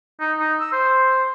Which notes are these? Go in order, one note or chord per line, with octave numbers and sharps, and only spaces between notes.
D#4
D#4
E6
C5